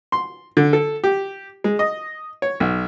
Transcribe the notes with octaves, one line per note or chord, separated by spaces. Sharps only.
C6
D3
A4
G4
G#3
D#5
C#5
B1